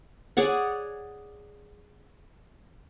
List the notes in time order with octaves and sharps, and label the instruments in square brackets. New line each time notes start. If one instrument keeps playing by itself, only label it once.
[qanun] G#4 C#5 D5 F#5